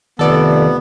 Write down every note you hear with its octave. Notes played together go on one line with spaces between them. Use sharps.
F1 D#3 B3 A4 D5